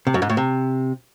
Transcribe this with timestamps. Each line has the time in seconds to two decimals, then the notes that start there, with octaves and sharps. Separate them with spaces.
0.07 C3
0.14 F#2
0.22 G#2
0.30 A2
0.37 C3